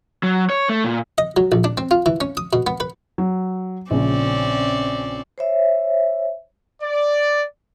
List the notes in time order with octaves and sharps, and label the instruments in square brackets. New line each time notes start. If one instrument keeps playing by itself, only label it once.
[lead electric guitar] F#3
C#5
A3
A#2
[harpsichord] D#5
F#3
A#1
D4
C4
F4
E3
C#4
D#6
B2
B3
B4
[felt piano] F#3
[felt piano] A#1 C#3 [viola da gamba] C4 C#4 D5
[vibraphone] C5 C#5 E5
[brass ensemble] D5